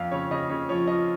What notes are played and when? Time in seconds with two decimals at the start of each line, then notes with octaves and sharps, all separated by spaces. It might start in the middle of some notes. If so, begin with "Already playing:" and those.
Already playing: F2 F3 F5
0.11 C#3 C#5
0.31 C#3 D#5
0.50 C#3 C#5
0.69 F3 C#5
0.88 F3 D#5